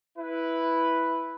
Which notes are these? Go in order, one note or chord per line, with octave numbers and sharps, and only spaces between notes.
E4 B4